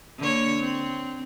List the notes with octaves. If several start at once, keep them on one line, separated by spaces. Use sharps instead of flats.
D3 A#3 C#5
C4